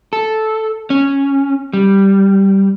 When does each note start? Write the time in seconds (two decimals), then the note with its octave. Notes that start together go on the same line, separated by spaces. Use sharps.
0.13 A4
0.90 C#4
1.73 G3